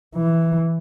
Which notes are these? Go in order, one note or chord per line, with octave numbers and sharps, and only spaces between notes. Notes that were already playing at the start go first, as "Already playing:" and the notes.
E3